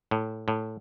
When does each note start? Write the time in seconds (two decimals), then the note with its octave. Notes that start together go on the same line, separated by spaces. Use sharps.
0.11 A2
0.48 A2